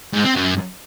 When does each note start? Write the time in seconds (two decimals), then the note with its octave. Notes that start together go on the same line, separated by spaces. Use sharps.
0.13 G#2
0.25 C4
0.36 F#2